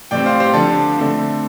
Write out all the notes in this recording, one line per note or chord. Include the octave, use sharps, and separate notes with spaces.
A2 G3 C4 D5 G5
C5 F5
G4 C5
D3 F3 D4 A4 D5
D3 A3 C4